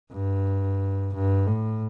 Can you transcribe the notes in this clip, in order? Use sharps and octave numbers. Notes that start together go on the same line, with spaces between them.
G2
G2
A2